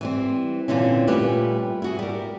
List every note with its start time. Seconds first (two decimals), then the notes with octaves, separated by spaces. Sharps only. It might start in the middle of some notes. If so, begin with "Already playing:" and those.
0.01 E3 G3 C4
0.68 A#2 D3 E3 C4 C#4
1.07 A#2 G3 A3 G4 B4 G#5
1.82 E4 F#4 G#4
1.99 G3 A#4